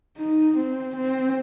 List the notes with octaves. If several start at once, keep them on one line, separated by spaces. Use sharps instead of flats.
D#4
C4
C4